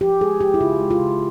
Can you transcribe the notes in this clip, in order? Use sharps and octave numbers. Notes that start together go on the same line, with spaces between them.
F3 G4
G#3 G#4
F3 G4
E4
C#3 F4
G#3
F4
C#3